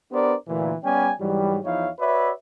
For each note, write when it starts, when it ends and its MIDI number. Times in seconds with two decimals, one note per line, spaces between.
0.12 0.34 59
0.12 0.34 62
0.12 0.34 67
0.12 0.34 70
0.12 0.34 72
0.12 0.34 74
0.48 0.73 38
0.48 0.73 46
0.48 0.73 52
0.84 1.11 55
0.84 1.11 59
0.84 1.11 61
0.84 1.11 74
0.84 1.11 79
0.84 1.11 80
1.19 1.58 44
1.19 1.58 52
1.19 1.58 54
1.19 1.58 55
1.64 1.88 40
1.64 1.88 53
1.64 1.88 63
1.64 1.88 64
1.64 1.88 73
1.64 1.88 77
2.00 2.31 66
2.00 2.31 71
2.00 2.31 73
2.00 2.31 74
2.00 2.31 76